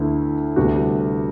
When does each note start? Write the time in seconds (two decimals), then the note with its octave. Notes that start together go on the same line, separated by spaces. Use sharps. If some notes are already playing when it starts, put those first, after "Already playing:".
Already playing: D2 D3 A3 E4 B4
0.56 D2 C3 G3 B3 F#4